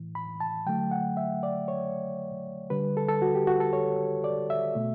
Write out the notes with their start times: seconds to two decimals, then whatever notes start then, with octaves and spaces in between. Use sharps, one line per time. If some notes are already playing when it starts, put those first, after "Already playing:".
Already playing: A2 E3
0.15 B5
0.40 A5
0.66 D3 F#3 A3 G5
0.91 F#5
1.17 E5
1.43 D5
1.68 C#5
2.70 D3 G3 B4
2.97 A4
3.09 A4
3.22 F#4
3.35 G4
3.47 F#4
3.60 A4
3.73 C#5
4.24 D5
4.50 E5
4.75 B2 A3